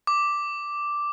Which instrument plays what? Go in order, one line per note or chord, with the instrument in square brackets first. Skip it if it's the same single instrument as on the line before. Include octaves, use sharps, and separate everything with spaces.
[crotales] D6